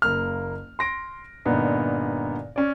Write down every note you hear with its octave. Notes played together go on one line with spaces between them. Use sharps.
F#1 A#3 F6
C6 A#6 D7
G2 A#2 D3 B3 D#4
C#4 D5